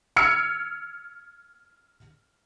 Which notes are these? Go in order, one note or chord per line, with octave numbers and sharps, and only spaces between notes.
E6 F6 G#6 C#7 D7